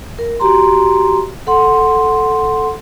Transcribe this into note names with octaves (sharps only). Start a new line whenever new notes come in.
A#4
F#4 G4 A#5 C6
A4 F#5 C6